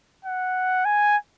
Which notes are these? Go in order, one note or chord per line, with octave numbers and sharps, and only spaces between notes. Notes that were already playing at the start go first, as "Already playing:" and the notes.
F#5
G#5